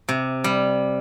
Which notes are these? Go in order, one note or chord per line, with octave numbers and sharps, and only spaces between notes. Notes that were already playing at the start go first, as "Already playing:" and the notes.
C3
G3